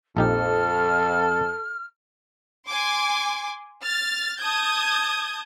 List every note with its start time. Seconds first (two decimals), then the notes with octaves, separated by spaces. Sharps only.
0.17 A#1 F2 D#4 G4 A4 F6
2.67 G#5 C6 D6
3.83 F6 A6
4.40 A5 D#6 G6 G#6